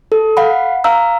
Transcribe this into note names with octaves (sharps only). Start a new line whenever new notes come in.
A4
F5 F#5 B5
F5 A#5 E6